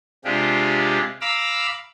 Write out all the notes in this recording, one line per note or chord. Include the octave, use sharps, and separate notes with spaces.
C3 G#3 D4 F4 G4
F5 A#5 B5 D6 E6